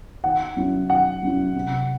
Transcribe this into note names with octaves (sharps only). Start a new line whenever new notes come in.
D#3 F#5
F#3 C#4 E4
D#3 F#5
F#3 C#4 E4
C3